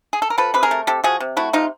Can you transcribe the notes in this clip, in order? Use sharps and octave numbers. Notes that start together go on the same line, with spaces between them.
G#4
A4
A#4
F3 A4 B4
C3 B4
G#4 A#4
A3
C3 G4 A4
F3 F#4 G#4
C3
A3 E4 F#4
C3 D#4 F4